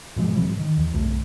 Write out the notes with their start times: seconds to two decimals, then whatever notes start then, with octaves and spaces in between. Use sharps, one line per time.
0.16 G#2 B2 F3 G#3
0.35 G#2 C3 F3 G3
0.59 D#3
0.77 E2
0.93 B1 G2 D3 A3